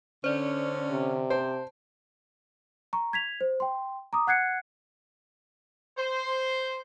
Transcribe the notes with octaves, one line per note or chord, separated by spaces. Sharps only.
D3 C#4 C5 D5
C3
C5 A5
A#5 C#6
G#6 B6 F7
C5
G5 C6
A#5 D6 D#6
F#5 F#6 G#6 C7 C#7
C5